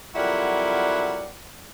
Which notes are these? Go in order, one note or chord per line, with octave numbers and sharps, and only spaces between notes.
F2 F#3 G3 E4 A#4 F#5